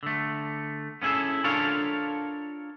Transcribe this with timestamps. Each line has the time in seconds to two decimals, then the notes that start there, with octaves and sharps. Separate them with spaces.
0.03 D3 A3
1.02 B3 C#4 E4 G#4 A4
1.44 D4 F4 A4 A#4 C#5 F5